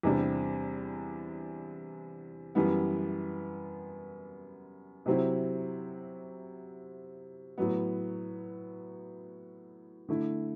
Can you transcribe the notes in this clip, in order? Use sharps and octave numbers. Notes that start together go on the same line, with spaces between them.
E2 C3 G3 D4
F#2 E3 G3 B3
C3 F#3 C4 E4
A2 F#3 B3
D3 A3 E4